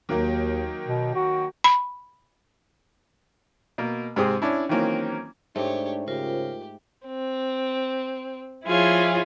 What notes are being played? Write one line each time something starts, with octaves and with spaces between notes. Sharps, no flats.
D#2 D#3 F#3 A#3
B2
F#4
B5
B2 A#3
G#2 C3 C4 G#4 D#6
C#4 D4 E4
D#3 E3 F#3 A#3 C4 C#4
G#2 A3 D4 G4 C#5
C#3 F4 G4 A#4 C5
C4
F3 E4 F4 G#4 C#5